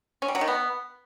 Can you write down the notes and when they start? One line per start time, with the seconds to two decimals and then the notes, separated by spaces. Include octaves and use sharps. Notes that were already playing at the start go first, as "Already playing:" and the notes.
0.22 C#4
0.28 G3
0.35 F#3
0.41 D#3
0.48 B3